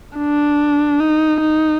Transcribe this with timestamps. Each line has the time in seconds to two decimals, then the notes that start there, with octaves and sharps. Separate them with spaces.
0.17 D4
1.00 D#4
1.41 D#4